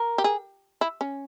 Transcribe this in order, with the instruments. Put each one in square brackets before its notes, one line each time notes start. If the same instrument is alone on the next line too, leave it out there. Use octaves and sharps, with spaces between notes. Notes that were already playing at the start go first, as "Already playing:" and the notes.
Already playing: [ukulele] A#4
[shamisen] G4
G#4
E4
C#4